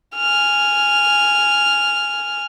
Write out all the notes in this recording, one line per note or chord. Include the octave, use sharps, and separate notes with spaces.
G#5 F6